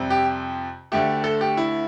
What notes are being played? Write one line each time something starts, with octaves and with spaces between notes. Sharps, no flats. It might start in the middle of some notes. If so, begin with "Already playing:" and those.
Already playing: F2 C3 G3 C4
G4
D2 D3 A3 G4
A4
G4
E4